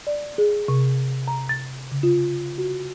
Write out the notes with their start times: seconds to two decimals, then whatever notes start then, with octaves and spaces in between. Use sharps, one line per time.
0.07 D5
0.38 G#4
0.68 C3
1.28 A#5
1.49 A6
1.91 C#3
2.03 F4
2.58 F#4